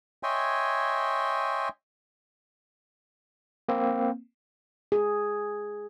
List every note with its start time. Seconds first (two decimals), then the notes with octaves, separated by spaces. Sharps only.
0.23 C#5 D#5 E5 G5 G#5 C6
3.69 A#3 C4
4.92 G#4